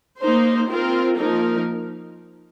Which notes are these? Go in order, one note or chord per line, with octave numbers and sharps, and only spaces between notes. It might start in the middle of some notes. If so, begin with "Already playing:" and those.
A#3 D#4 C5
C4 F4 A#4
F3 A#3 D#4 A#4